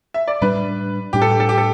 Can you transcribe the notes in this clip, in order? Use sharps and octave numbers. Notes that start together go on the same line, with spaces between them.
E5
D5
A2 G3 D4 B4
A2 G3 D4 G4
A4
G4
A4
G4
A4